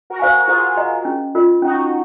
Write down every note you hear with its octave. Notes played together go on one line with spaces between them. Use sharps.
F#4 A#4
C5 F5 G#5
F#4
F4 G#4 C5
D#5 A#5
C#4
F4 A#4 D#5
C#4 D#4 F#4